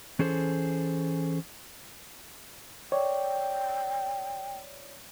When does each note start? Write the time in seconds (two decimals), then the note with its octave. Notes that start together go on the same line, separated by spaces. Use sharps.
0.19 E3 C#4 G#4 A4 C5
2.92 C#5 D5 G5